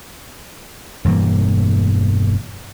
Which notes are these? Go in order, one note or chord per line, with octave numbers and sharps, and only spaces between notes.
E1 G2 E3 A#3